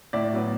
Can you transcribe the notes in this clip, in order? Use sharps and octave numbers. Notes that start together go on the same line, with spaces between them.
A2 D5 E5
F#3 B3